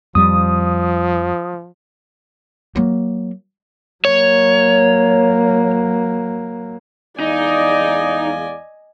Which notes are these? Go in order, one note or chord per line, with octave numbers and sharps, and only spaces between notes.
F2 F3 G3 D#6
F#3 A#3
F#3 A#3 C#5
E2 G#3 D#4 D5 D#5 F5 G#5